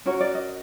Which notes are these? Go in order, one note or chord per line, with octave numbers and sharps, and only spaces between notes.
C#4 F#4 A#4 C#5
D5
D#5